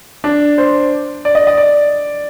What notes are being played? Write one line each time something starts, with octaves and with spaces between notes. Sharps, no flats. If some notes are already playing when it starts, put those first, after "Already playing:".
D4
C5
D5
D#5
D#5
D5